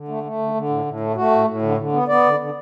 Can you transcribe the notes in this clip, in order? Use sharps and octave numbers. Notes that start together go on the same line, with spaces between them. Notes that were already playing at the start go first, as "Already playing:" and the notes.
Already playing: D3
A3
A3
D3
D3
A2
A2
A3
A3 F#4
A2
A2
D3
D3
B3
B3 D5
D3
D3